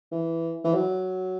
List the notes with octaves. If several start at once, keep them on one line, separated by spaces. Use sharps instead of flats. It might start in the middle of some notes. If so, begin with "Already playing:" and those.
E3
E3
F#3